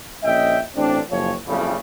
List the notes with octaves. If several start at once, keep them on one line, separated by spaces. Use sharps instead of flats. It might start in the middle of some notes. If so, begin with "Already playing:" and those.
A#1 C#4 D#5 E5 G5
A1 C4 D4
F#1 F3 C#5
F#1 F2 A2 C#3 G3